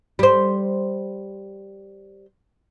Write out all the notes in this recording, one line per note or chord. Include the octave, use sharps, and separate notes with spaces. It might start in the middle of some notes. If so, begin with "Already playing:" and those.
G3 C5